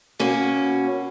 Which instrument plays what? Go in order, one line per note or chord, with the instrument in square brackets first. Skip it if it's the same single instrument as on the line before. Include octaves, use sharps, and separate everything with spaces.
[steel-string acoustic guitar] B2 A#3 C#4 F#4